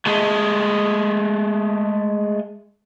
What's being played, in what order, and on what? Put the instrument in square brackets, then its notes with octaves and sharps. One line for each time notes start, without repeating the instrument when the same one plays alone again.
[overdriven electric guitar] G#3 A3